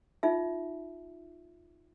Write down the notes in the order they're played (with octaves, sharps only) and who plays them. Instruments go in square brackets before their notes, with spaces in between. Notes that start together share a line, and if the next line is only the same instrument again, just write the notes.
[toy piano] D#4 F4 E5